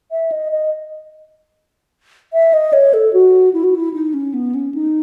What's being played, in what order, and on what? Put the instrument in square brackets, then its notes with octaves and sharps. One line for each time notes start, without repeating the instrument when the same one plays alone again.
[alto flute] E5
D#5
D#5
E5
D#5
C#5
A4
F#4
E4
F#4
E4
D#4
C#4
B3
C#4
D#4